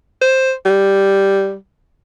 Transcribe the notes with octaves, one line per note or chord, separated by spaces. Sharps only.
C5
G3